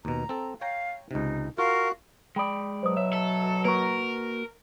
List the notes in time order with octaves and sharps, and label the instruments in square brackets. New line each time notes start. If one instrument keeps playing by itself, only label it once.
[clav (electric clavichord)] D#2 B2 [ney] A#5
[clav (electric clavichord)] C4 A4
[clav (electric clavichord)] C#5 G5 A#5 [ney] F5
[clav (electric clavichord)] C#2 C3 [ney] D#4
[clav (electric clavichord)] F4 [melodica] F#4 [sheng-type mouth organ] A#4 [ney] F5
[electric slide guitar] G#3 D5 [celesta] G5 B5 D#6
[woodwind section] B2 F#3 [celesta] C5 D#6
[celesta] C#5 [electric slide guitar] E5
[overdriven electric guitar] A4
[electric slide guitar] A#3 F#4 [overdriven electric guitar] A#4 [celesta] B4 A#5 C#6